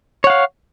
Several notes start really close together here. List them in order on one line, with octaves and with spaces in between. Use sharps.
C#5 F#5 F5